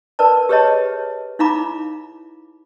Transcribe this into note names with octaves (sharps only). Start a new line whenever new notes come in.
A#4 B4 D5 A5
G4 G#4 B4 C#5 D#5 A5
D#4 E4 F5 A#5 B5 D6